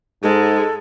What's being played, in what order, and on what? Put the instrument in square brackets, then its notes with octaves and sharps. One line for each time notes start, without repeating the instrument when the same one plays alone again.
[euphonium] G#2 [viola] G#3 [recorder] A4